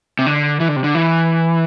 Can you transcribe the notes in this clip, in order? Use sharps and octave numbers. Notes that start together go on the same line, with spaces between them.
C3
D3
E3
D3
C3
D3
E3